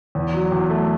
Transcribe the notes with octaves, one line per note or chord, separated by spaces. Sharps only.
E2
F#3
E2
A3